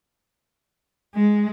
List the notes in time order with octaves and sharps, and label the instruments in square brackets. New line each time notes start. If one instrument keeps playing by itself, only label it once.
[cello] G#3